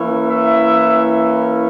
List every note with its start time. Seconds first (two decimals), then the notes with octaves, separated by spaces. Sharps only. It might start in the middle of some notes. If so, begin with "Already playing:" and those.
Already playing: E3 A#3 C#4 E4
0.26 E5